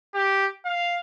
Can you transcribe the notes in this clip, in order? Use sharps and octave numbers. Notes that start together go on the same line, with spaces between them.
G4
F5